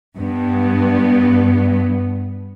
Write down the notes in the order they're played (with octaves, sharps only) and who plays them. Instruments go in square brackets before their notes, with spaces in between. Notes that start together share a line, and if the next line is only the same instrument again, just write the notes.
[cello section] G2 B3